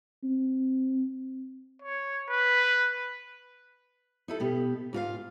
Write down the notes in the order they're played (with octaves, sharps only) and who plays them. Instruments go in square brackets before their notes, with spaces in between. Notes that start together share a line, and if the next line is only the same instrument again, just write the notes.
[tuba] C4
[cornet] C#5
B4
[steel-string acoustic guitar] D#4 E4 A4
B2 B3 G4
G#2 F4 C5 F5